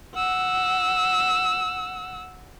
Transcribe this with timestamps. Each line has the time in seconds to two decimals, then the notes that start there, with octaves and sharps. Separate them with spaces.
0.15 F#5 E6